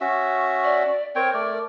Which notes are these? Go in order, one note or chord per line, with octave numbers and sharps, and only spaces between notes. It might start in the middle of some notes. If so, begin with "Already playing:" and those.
C#4 F#4 E5
D5
C4 A#4 C#5 G5
A3 D5